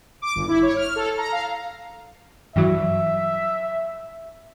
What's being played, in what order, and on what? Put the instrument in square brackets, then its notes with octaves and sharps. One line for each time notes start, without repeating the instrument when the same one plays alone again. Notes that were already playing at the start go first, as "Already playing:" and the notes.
[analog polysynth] D6
G1
E4
C#5
F6
A4
A#5
F5
[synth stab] G2 E3 F#3 [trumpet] E5